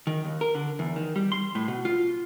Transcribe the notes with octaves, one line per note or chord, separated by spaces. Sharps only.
D#3
D#2
A#4
D3
E2
D#3
G3
C6
A2
B2
F4